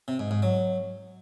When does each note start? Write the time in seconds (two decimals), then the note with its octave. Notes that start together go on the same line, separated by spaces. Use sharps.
0.08 C3
0.19 G#2
0.31 G#2
0.42 F#3